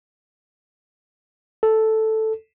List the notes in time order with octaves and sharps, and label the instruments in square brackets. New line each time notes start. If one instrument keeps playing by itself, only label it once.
[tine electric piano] A4